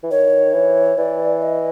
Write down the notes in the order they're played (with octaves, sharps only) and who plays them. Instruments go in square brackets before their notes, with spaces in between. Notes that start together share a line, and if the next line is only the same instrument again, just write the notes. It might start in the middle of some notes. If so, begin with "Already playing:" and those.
[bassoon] E3
[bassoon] D#3 [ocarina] C#5
[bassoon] E3
[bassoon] E3 [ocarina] D5
[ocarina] D#5